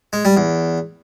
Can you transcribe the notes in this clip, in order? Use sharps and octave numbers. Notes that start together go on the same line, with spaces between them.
G#3
G3
E2